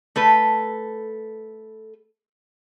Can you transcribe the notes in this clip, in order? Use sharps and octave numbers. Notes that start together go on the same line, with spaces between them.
A3 A4 B4